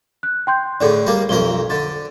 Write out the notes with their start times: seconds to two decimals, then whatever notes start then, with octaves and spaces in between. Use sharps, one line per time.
0.23 F#6
0.47 G5 C6 G6
0.81 A2 D3 G#4 A4 D5
1.07 G3 A#3
1.29 B1 F2 A#4 G7
1.70 D3 A6